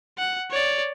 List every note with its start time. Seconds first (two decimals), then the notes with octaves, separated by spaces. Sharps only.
0.18 F#5
0.51 C#5 D5